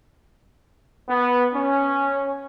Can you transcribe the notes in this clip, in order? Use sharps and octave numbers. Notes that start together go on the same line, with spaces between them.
B3
C#4